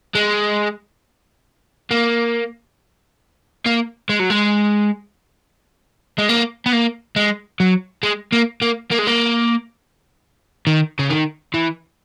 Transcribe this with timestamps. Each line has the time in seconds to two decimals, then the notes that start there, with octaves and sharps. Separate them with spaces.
0.15 G#3
1.91 A#3
3.66 A#3
4.09 G#3
4.20 F#3
4.30 G#3
6.18 G#3
6.29 A#3
6.66 B3
6.73 A#3
7.16 G#3
7.60 F#3
8.03 G#3
8.32 A#3
8.62 A#3
8.91 A#3
8.99 G#3
9.07 A#3
10.67 D#3
10.99 C#3
11.10 D#3
11.54 E3